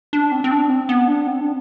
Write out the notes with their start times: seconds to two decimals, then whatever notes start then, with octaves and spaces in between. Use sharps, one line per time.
0.13 D4
0.32 C4
0.44 C4
0.51 D4
0.70 C4
0.89 B3
1.08 D4
1.27 C4
1.41 D4